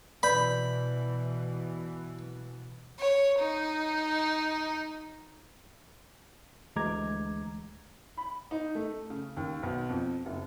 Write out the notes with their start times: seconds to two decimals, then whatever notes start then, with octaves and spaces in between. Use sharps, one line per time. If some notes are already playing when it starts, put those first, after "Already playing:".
0.23 B2 E3 B4 D5 B5 G6
2.99 C#5
3.39 D#4
6.76 D2 E3 G#3 A#5 D6 G#6
8.17 B5
8.51 D#4
8.75 A3
9.10 C#3
9.36 D#2
9.63 B1
9.89 F2
10.25 F#1